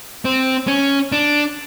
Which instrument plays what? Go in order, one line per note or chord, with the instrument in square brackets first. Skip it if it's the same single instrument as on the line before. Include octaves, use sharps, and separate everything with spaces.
[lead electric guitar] C4
C#4
D4